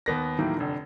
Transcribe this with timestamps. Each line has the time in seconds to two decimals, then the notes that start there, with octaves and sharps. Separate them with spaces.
0.06 D#2 B3 A#6
0.38 A2 D#3 E3 F#3 A#3
0.57 F1 D3